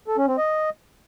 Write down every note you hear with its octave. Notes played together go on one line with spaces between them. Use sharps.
A4
C#4
C4
D#5